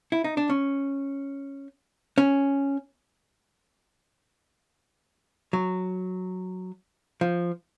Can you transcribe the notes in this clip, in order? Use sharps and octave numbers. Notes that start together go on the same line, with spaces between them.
E4
D#4
D4
C#4
C#4
F#3
F3